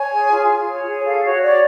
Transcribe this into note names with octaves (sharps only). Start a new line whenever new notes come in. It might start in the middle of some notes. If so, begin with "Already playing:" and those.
Already playing: C#5 G#5
G#4
F4
F4
C#5
G#4
A4 F5
F#4 C#5
C#5 D5